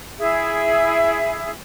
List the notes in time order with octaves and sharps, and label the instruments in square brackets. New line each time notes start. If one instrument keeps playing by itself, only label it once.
[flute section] E4 G#4 E5